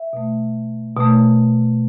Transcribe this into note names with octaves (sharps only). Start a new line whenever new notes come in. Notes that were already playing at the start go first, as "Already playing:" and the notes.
Already playing: E5
B2 A3
B2 A3